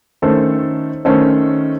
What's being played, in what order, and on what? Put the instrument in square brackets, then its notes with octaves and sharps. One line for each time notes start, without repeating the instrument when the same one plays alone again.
[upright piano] D#3 A3 C#4 A4 C5
D#3 A3 C#4 A4 C5